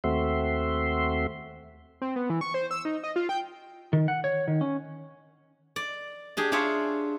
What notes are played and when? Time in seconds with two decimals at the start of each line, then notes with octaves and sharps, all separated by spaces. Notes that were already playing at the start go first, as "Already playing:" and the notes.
0.04 D#2 A3 C4 F#4 E5 C6
2.01 C4
2.16 B3
2.30 E3
2.41 C#6
2.54 C5
2.71 E6
2.85 D#4
3.04 D#5
3.16 F4
3.29 G5
3.93 D#3
4.08 F#5
4.24 C#5
4.48 D#3
4.61 C#4
5.76 D5
6.37 D4 G4 G#4
6.52 D4 F4 G#4 C#5 E5